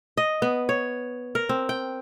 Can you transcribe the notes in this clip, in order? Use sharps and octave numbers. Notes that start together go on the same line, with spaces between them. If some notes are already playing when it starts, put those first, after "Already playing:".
D#5
B3
C#5
A#4
C4
G5